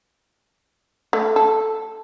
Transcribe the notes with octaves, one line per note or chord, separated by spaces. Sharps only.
A3
A4